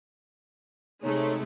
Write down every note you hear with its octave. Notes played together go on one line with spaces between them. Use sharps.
C3 G#3 A3 D#4 C#5